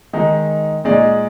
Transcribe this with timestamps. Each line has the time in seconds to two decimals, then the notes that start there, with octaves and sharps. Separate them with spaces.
0.13 D#3 G#3 D#4
0.84 A#2 G#3 D#4 G#4 D5